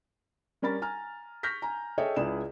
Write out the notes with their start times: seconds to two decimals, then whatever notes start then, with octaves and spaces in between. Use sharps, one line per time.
0.62 G3 C#4 A#4 B5 A6
0.82 G#5 A#5 F6
1.43 C#6 F6 G6 A#6 B6
1.62 G#5 A#5
1.98 G#4 A4 C#5 D#5 E5 G5
2.16 C#2 E4 G#4 D5 E7